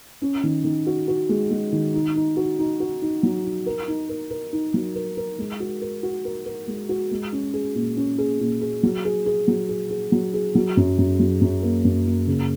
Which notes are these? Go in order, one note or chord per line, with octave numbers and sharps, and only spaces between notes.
C#4
D#3
D#3
F#4
F#4
G#3
G#3
D#3
D#4
D#4
F#4
D#4
F#4
D#4
F#3
D#4
A#4
D#4
A#4
A#4
D#4
F#3
A#4
A#4
G#3
F#4
A#4
F#4
A#4
A#4
G#3
F#4
G#3
C#4
G#4
A#2
C#4
G#4
A#2
G#4
F#3
G#4
G#4
F#3
G#4
G#4
F#3
G#4
F#3
F#2
F#2
F#3
F#2
A#3
F#2
A#3
C#3